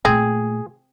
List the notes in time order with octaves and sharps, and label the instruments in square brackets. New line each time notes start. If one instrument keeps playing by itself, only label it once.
[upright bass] A#2 A3 [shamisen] C4 [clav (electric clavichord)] G#4